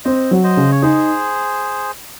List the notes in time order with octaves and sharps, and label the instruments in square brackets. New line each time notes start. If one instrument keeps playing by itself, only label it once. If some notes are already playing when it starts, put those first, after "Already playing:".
[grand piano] C4 [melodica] C5 D#5
[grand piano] F#3
[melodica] C5 D#5
[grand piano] C#3
[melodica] C#5
[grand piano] D#4 [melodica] G#4 C5